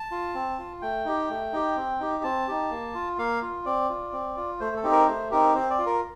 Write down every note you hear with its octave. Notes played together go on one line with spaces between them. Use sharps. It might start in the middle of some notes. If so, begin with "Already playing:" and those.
Already playing: A5
F4
C4
F4
A3 G5
D#4 G4
A3
D#4 G4
C4
D#4 G4
C4 A5
D#4 G4
A#3
F4
A#3 F5
F4
C4 D5
F4
C4
F4
A3 C5
A4
C4 D#4 G4
A#4
A3 C5
C4 D#4 G4 A#4
C4 C5
D5
F4
A#4